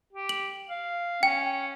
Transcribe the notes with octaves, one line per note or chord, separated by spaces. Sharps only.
G4
F#7
F5
C#4 G5